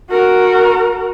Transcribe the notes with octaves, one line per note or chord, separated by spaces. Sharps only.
F#4 A#4